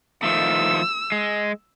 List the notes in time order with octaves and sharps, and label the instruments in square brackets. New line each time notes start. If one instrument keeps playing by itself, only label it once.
[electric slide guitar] D#3 F3 A3 [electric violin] E6
[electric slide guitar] G#3